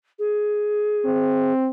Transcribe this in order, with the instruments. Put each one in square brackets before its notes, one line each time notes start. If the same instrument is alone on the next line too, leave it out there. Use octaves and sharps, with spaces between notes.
[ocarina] G#4
[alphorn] C4